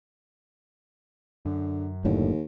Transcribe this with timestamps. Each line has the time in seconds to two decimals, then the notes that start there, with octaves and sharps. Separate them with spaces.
1.45 F#2 D3
2.05 F#1 D#2 A2 D3